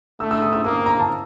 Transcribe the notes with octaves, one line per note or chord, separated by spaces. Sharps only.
A3 E6
E6
D#6
E6
A#3 D#6
A#5
A5